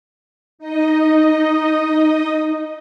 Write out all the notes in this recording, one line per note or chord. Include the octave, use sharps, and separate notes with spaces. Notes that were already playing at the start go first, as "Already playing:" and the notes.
D#4 D#5